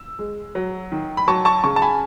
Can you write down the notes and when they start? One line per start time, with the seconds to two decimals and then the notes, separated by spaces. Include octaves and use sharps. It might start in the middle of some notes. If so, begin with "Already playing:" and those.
Already playing: E6
0.19 G#3
0.55 F#3
0.92 D#3
1.17 B5
1.28 F#3 A5 C#6
1.45 A5 C#6
1.64 C#3 A5 C#6
1.76 A5
1.82 G#5 B5